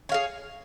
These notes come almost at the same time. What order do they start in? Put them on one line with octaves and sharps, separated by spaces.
C#5 F5 G#4